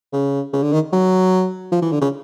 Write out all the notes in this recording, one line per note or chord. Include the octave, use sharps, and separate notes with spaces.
C#3
C#3
D3
D#3
F#3
F3
E3
D3
C#3